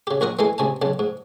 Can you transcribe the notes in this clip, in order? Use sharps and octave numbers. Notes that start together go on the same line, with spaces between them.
C#3 G4
A#1 F#4 A#4 C#6 D#6
E3 G#3 A4 G#5 C6
C#2 C3 G#5 A5
B1 C#3 A5
G#2